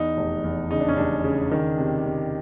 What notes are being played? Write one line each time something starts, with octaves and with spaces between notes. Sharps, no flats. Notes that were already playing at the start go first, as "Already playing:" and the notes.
Already playing: E2 D#4
F1
E2
C#3 D#4
D4
C#4
F1 D4
C#3
D#3
C3
C3